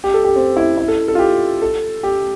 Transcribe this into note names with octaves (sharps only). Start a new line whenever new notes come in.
G4
A4
G4
C4
E4
E4
A4
A4
F4
G4
A4
G4